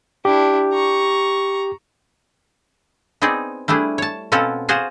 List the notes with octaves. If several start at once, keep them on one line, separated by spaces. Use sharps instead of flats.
D4 E4 G4
A#5 C#6
B3 C4 D#4 G#4 D5
G3 A3 D4 E4 G#4
C#5 A5
B2 C4 C#4 F4 A4 F#5
F4 F#4 G#4 C5 F#5